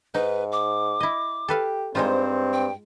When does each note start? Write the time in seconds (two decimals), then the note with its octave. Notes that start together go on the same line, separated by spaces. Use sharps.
0.14 G#2 D#4 B4
0.52 D6
1.00 E4 D#5
1.48 G4 A4 B4 F5
1.95 G2 G#3 C4 D#4 F4 C5
2.53 G5